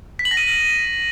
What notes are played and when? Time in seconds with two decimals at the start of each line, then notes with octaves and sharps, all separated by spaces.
0.19 B6
0.25 F#7
0.31 A#6
0.37 D#7